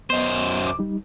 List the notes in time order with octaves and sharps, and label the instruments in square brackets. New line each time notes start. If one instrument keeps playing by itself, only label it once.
[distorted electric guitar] F#2 C5 [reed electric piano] B3 D#5
[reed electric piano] C2 D6
G3 D#4